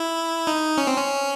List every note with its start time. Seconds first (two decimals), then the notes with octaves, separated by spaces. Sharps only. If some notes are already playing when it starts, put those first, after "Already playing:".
Already playing: E4
0.47 D#4
0.77 C#4
0.87 C4
0.97 C#4